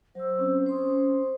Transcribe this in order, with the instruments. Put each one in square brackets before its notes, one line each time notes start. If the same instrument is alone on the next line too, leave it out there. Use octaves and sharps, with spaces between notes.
[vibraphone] F#3 E6 [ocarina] C5
[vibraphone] C4 C#4
[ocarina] C#4 [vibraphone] C5 C6 D#6